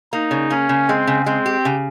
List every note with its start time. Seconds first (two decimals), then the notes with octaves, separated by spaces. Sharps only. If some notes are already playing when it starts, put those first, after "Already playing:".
0.13 A#3 D#4
0.31 C#3
0.50 A#3 C#4
0.69 C#3
0.88 G#3 C4
1.07 C#3
1.26 G#3 C4
1.46 G4
1.65 C#3